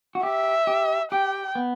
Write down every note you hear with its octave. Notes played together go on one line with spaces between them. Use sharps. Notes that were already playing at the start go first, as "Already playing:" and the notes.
F#4
G4 E5
G4
G4 G5
B3